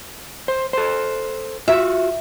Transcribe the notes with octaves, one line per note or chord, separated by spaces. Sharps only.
C5
A4 C5
F4 F#4 E5